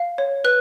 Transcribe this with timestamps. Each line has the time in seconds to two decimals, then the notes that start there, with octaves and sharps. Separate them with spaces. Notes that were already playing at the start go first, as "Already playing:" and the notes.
Already playing: F5
0.18 C#5
0.44 B4 F#6